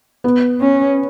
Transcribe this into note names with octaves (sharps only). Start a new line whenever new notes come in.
B3
C#4